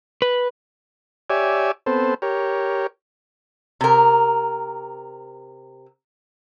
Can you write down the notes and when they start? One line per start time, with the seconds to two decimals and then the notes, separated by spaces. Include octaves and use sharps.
0.22 B4
1.30 G4 C#5 D5 E5 G#5
1.86 B3 C4 A4 C5
2.22 G4 A#4 C#5
3.81 C3 A#4